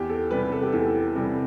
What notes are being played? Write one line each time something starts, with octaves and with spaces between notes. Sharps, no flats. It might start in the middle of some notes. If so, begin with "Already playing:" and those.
Already playing: E2 G4
A4
C3 G3 B4
A4
G4
E2 A4
C3 G3